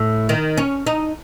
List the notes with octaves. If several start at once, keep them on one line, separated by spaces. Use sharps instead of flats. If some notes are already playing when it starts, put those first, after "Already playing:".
Already playing: A2
D#3
C#4
D#4